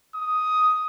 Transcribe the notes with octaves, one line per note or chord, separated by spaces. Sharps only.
D#6